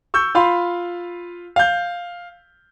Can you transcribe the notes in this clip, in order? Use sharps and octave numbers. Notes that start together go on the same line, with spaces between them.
C#6 E6 G6
F4 F5 B5 C6
F5 G6